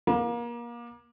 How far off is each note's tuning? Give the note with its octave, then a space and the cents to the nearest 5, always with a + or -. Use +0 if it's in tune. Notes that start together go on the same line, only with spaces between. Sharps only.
A#3 +30